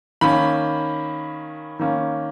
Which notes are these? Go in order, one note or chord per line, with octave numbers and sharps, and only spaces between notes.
D#3 A#3 C#4 B5
D#3 A#3 C#4